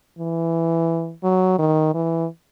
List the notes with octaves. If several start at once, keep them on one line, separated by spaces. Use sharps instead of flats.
E3
F#3
D#3
E3